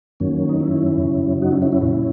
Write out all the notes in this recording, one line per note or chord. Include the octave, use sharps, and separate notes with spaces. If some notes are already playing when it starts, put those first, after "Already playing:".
F#2 D#3 F#3 A#3 C#4
D#4
C#4 E4
F#2 C#3 F#3
D#4 F#4
C#4 E4
C#4 E4
C#4 E4
A#2 F#3 C#4 E4